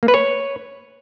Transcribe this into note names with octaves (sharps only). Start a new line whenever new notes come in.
A#3
B4
C#5